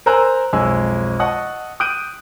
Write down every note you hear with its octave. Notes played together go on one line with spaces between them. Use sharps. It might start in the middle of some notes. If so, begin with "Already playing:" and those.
A#4 C5 G#5 A#5 E6 F#6
B1 F2 G#3 G#5 E6
D#5 F#5 A5 C#6 D#6
D#6 F#6 G6 D7 D#7